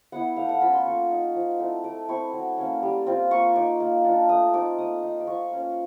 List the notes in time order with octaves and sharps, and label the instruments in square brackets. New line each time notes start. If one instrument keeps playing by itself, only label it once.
[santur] B3 E4 F#5
A3 F5
F#5
C#4 F4 B5
C6
A#3 C#6
D#4
F3
A3 C4 E4
A3 D6
C4 E4 C#6
F#3
A#3 C#4
G3
C4 F4
A#3 C#6
D#4 D6
A#3
D4 F4
A3 D#6
C4 D#4 D6
A#3 D#6
D#4
D6
F3 C#6
A#3 C#4